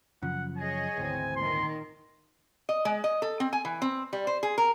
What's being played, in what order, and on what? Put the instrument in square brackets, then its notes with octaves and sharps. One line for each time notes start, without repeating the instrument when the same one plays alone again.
[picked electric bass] F#2 C#3 F3 [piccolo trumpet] F#5
[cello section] G#4 C#5 D#5 [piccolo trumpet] G#5
[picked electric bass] G#1 D2 [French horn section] E3 C4
[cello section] A#2 D#3 [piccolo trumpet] C6
[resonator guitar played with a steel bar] D#5
G#3
D#5
A4
C4
G#5
E3
C4
G3
C5
G#4
A#4